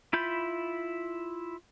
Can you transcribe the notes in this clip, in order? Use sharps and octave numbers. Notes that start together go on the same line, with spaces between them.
E4 F4 B5 G6